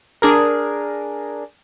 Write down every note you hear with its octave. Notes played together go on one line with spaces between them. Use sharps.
D4 G#4 A#4